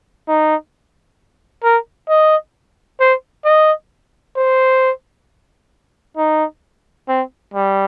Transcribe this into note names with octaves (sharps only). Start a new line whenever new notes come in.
D#4
A#4
D#5
C5
D#5
C5
D#4
C4
G3